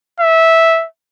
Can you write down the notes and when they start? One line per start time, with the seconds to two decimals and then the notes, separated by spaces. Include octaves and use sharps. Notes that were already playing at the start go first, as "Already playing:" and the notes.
0.20 E5